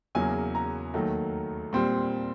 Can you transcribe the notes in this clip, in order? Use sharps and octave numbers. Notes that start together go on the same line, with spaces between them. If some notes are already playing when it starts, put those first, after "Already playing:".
E2 C#3 F#3 A#3 G#5
A#5
D#2 D#3 F#3 A3
A#2 G3 C4